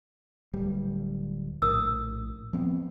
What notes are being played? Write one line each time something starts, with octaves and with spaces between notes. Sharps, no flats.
D1 G3
A#1 A2 A#4 D#6 E6
F3 B3 C4